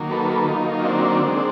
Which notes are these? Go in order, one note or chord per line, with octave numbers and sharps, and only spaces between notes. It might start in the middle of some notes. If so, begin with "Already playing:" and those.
Already playing: D#3 F#3 A#3
A4 B4
D#3 F#3 A#3 D#4 F4
C4 D4
D#3 G#3